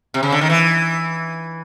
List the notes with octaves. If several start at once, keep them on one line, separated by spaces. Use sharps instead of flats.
C3
C#3
D3
D#3
E3